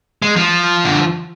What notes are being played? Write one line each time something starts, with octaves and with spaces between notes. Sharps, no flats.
G#3
F3
D3